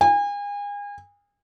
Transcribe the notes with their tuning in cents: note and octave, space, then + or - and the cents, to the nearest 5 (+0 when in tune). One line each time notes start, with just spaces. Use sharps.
G#5 -35